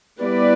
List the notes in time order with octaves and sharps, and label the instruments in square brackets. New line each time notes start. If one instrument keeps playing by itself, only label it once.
[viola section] G3 B3 E4 B4 D5